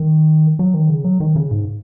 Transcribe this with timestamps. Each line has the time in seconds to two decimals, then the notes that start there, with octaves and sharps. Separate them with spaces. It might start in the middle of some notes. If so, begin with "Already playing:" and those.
Already playing: D#3
0.59 F#3
0.74 D#3
0.89 C#3
1.05 F#3
1.20 D#3
1.36 C#3
1.51 G#2